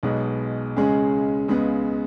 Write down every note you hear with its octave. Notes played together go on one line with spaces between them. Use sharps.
B1 B2 G#3 B3
C#2 C#3 G#3 C#4 G#4
C#2 C#3 G#3 B3